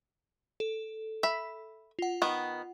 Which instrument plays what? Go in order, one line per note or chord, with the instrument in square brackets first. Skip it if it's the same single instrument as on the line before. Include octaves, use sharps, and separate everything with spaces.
[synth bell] A4
[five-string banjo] E5 B5
[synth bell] F4 F#5
[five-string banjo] D#3 B3